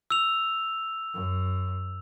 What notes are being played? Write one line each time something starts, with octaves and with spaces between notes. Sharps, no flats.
E6 F7
F#2